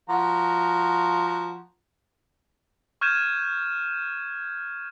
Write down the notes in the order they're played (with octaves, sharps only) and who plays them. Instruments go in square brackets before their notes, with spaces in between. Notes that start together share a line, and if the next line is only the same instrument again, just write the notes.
[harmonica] F3 F#4 A#5
[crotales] C#6 F6 G6 G#6 D#7 E7